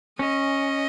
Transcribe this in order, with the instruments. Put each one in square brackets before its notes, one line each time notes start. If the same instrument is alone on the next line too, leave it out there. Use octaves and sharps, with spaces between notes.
[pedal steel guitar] C#4 [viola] D#5